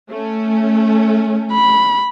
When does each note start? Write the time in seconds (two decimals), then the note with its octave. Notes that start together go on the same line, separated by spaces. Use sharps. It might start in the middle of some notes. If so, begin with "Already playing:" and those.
0.10 A3 C#4
1.52 B5